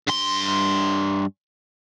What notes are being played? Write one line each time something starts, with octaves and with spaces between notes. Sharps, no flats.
G2 C6